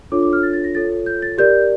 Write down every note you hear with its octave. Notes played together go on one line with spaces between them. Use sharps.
D4 F4 A4 C#5 D6
D6
F6
A6
A6
A#6
F4 A4 C#5 A6
G6
A6
G4 A#4 D5 G6